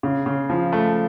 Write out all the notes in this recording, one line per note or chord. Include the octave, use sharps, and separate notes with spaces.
C#3
C#3
F3
A3